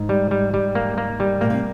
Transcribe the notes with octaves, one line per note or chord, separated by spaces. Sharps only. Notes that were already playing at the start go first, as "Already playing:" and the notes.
Already playing: G#2
G3
G3
G3
A#3
A#3
G3
A#2 A#3
C3